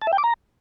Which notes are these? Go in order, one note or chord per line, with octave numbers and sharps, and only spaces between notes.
A5
E5
G5
D6
A#5